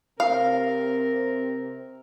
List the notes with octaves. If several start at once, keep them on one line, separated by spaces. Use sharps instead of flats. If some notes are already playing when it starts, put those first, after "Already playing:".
C3 C4 A#4 F5